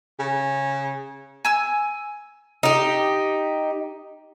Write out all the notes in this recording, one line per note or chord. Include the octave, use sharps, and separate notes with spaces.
C#3
G#5 E6
D#4 G4